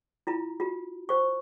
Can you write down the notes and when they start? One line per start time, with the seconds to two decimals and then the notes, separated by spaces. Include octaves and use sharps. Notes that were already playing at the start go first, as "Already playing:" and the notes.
0.27 E4 F4 A#5
0.60 F4 F#4
1.09 C5 C#6